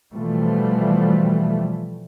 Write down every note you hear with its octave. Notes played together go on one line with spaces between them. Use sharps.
B2 E3 F3 G3 A3